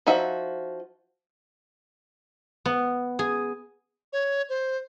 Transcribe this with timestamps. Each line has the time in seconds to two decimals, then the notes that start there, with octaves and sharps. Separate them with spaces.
0.07 F3 D#4 F#4 E5
2.66 B3
3.19 G#4
4.13 C#5
4.49 C5